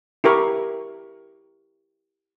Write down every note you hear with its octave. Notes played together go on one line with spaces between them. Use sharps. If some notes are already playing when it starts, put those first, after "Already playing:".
E4 G4 A#4 C#6